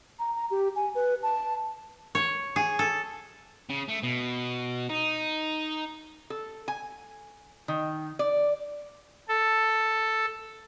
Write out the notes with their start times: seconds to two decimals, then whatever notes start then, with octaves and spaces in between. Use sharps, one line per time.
0.19 A#5
0.35 A#5
0.51 G4
0.76 G#5
0.95 B4
1.23 A5
2.15 C#5
2.56 G#4
2.79 A4
3.69 C#3
3.88 A3
4.03 B2
4.90 D#4
6.30 A4
6.68 G#5
7.68 D#3
8.19 D5
9.28 A4